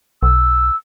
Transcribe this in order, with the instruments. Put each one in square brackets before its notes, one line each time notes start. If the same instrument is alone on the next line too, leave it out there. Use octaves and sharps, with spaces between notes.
[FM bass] B1 [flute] E6